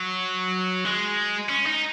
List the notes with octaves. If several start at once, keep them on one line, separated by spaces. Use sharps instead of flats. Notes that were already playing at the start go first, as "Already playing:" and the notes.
Already playing: F#3
G#3
C#4
D#4